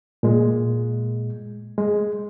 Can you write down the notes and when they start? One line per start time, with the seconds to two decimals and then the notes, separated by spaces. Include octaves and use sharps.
0.23 A#2 G#3
1.78 G#3